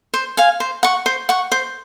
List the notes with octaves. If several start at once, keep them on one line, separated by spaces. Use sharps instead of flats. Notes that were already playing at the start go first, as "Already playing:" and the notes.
C5
F5 G#5
C5
F#5 C#6
C5
F#5 C#6
C5